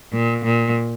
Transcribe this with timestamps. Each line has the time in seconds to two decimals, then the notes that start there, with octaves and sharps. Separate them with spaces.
0.13 A#2
0.44 A#2